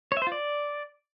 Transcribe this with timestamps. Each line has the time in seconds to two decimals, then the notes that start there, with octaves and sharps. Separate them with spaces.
0.12 C#5
0.17 E5
0.22 C5
0.27 F4
0.32 D5